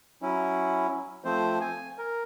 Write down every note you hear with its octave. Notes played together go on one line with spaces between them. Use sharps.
F#3 C#4 E4
F3 A3 C4 C5
G#5
A#4